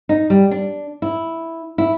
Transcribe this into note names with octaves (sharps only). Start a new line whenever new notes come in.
D#4
G3
D4
E4
E4